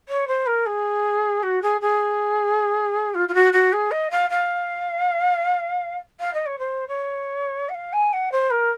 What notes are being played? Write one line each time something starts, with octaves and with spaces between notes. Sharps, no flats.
C#5
C5
A#4
G#4
F#4
G#4
G#4
F4
F4
F#4
F#4
G#4
D#5
F5
F5
F5
D#5
C#5
C5
C#5
F#5
F5
G#5
F#5
C5
A#4